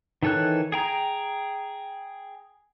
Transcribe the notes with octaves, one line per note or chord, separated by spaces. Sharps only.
D#3 E3 A4 C#5 F#6
G#4 G5 A#5